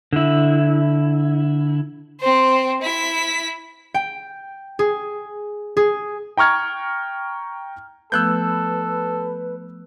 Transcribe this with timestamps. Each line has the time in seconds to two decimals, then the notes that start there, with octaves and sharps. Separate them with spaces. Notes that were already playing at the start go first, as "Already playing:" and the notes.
0.13 D3 E4
2.20 C4 C5
2.82 E4 B6
3.94 G5
4.79 G#4
5.77 G#4
6.37 G5 A#5 C#6 F6 G#6
8.12 F3 A3 B3 A4 B4 E6 F#6 G6